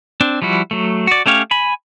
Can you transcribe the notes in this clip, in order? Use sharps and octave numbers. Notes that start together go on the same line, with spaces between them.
C4 D4
F3 G3 E4 F#4
F#3 A3
F#4 D5
A3 C#4 G4 C#5 F5
G#5 B5